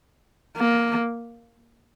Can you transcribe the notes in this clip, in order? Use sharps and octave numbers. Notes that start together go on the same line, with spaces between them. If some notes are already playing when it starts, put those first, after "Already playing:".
A#3